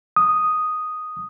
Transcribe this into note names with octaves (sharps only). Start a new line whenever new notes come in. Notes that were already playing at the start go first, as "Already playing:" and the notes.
D#6